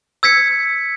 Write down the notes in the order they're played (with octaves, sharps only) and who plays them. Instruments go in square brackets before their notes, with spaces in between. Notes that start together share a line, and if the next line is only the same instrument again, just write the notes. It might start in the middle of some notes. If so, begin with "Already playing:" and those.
[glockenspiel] E6 G#6 B6 C#7